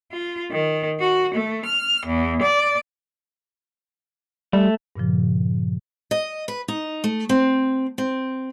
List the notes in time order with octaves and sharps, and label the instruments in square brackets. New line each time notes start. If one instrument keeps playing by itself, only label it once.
[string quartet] F4
D#3
F#4
A3
F6
E2
D5
[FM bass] G3 [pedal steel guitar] A3
[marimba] G2 A#2 C#3 F3
[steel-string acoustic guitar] D#5
B4
D#4
A3
C4
C4